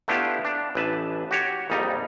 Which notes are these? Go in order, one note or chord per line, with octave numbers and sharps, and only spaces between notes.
A3 B3 D4 E4 F4 G4
D4
A1 B4 E5 A5
F#4 G4 C#5
A#1 F2 G3 D#4